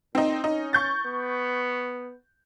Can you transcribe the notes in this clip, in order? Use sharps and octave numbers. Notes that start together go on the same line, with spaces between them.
A#2 C4 D#4
C#4 D#4
C#6 G6 A6
B3